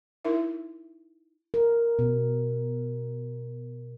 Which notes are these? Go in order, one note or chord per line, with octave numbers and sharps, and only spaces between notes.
D#4 E4 A#4 E5
A#4
B2